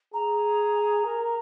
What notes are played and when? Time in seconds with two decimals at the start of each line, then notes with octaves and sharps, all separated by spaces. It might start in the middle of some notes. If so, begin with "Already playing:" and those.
0.14 G#4 A#5
1.05 A#4